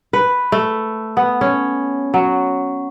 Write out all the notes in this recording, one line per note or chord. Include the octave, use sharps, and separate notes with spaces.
B4
A3
B3
C#4
F#3